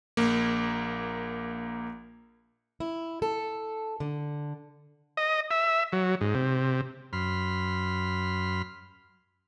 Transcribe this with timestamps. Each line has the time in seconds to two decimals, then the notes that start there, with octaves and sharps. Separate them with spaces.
0.17 A#1 A#3
2.80 E4
3.22 A4
4.00 D3
5.17 D#5
5.51 E5
5.92 F#3
6.21 G#2
6.35 C3
7.13 F#2 B5 C6 F6